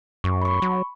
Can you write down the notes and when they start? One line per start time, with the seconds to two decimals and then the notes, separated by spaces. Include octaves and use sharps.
0.24 F#2 C#6
0.42 B5 C#6
0.62 F#3